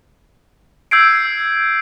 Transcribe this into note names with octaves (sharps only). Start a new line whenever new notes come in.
E6 G6 G#6 C7 D7